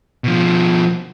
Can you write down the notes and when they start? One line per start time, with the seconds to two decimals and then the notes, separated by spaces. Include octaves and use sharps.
0.24 B2 F3